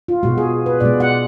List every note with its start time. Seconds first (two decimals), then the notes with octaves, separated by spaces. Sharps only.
0.08 F4
0.23 B2 G#3 F#4
0.38 G#4
0.66 B4
0.80 B2 G#3 D5
1.00 F#5